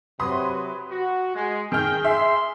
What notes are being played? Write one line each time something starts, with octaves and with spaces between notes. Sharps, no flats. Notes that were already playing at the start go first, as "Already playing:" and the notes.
C3 F#3 B4 C6 D#6
F#4
G#3
D#3 G#4 G5 F6
G#4 E5 C6